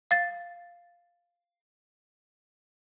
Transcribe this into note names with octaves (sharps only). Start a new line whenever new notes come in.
F5 A6